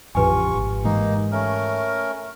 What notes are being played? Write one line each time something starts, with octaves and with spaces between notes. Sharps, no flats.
A1 F2 C#3 F4 G4 B4 G#5 C#6
G#1
G#2 E3 G#3 A#3 D#4
A3 C#4 A#4